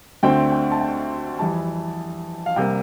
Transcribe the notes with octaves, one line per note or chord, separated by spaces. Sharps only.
D2 D3 A3 C4 G5
G5
A5
G5
F2 E3 G3 A5
F5
C2 C3 G3 A#3 G5